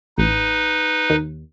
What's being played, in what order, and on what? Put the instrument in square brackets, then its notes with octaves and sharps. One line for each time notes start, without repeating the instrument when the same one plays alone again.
[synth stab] A1 [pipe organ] D#4 B4
[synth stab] D#2